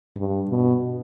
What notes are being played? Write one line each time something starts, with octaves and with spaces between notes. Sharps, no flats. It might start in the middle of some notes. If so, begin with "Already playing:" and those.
G2
B2